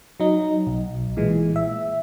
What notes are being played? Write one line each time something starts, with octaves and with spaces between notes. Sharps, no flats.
F#3 D#4
B1
A#2 E3 G#3
E5